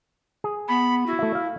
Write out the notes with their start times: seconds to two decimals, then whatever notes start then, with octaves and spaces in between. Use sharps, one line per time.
0.44 G#4
0.68 B3 B5
1.06 E4 F#4
1.19 A3 E5
1.35 F5